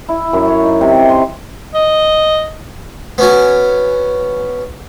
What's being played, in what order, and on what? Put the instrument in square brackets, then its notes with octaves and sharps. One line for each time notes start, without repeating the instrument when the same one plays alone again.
[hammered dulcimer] E4
F#2
C#5
D#4
C3
C3
C6
[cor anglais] D#5
[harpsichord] B3 C#4 F#4 G#5